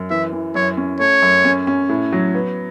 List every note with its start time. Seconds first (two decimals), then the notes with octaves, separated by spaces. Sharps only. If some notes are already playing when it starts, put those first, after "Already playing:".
Already playing: F#2
0.10 E3 E5
0.33 E3
0.55 F#2 C#5
0.77 C#4
1.00 A3 C#5
1.22 F#2
1.45 C#4
1.67 C#4
1.89 A2
2.13 F#3
2.34 B3